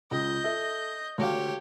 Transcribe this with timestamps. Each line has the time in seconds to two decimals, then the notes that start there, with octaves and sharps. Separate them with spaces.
0.11 C#2 D#5 G6
0.44 A4 E5
1.18 D2 G4 C#5 F5